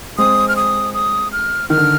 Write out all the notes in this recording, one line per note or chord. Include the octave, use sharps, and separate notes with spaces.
G#3 C4 D#6
F6
D#6
D#6
F6
D#3 F6
D3